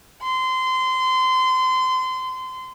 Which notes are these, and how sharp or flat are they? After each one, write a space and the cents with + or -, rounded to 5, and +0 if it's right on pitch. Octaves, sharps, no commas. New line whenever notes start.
C6 -25